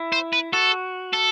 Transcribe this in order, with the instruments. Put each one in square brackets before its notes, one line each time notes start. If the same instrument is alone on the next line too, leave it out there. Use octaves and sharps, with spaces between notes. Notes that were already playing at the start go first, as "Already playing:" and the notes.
Already playing: [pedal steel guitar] E4
[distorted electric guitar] C5
B4
[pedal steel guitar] F#4 [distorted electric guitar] A4
[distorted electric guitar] A4